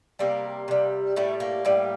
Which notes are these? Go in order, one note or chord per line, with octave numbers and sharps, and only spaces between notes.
C3 G3 A#3
C3 G3
A2 G3 A3
A#3
A2 G3